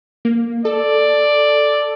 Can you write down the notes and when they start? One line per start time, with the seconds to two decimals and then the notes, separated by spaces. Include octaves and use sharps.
0.25 A#3
0.65 A4 D5